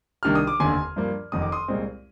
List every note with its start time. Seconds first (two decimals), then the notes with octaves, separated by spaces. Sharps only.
0.23 C2 C3 D#3 A#3 D4 F6
0.35 D#6
0.47 D6
0.60 F1 D#2 D3 G#5 C6
0.96 G2 F3 A#3
1.32 F1 F2 D#3 D#6
1.42 D6
1.52 C6 D#6
1.68 C2 A#2 G#3 C4